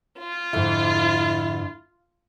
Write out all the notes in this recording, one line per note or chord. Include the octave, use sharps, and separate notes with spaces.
F4
F2 G#2 D3 E4